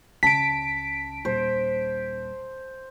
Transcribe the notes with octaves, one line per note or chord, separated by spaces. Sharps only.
C#2 C#3 A5 B6 D7
D#1 C5